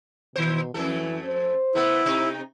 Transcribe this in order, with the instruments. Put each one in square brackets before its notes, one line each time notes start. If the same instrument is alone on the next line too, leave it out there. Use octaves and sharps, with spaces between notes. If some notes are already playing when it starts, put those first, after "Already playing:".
[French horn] B2 [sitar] D#3 C5
[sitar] F2 A3 A4 [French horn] E3
[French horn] C5
[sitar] A3 B3 [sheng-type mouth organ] E4
[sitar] C3 D#4